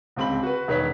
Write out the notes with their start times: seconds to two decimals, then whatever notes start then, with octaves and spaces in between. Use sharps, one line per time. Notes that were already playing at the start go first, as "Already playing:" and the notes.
0.16 D1 C#2 C4 B5 F#7
0.43 F#4 B4
0.68 E1 D#3 B4 C#5 B6